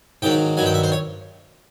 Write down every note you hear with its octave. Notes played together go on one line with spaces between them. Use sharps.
G#2 D#3 F#3 G5
G2 D#3 F#3 G#5
G5
E5
C5
C#5